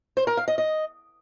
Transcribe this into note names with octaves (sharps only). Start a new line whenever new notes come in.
C5
A#4
F5
D#5
D#5